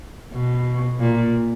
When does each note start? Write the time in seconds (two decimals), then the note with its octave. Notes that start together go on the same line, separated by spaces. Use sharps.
0.33 B2
1.00 A#2